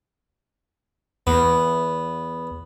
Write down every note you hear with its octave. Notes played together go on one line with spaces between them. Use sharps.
E2 B3